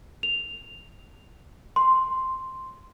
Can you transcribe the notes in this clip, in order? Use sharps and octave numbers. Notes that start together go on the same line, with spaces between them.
F7
C6